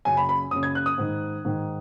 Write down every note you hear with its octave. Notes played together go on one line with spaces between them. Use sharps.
F#2 C#3 G#5
B5
B5
F#2 C#3 D#6
G#6
F#6
D#6
G#2 D#3
G#2 D#3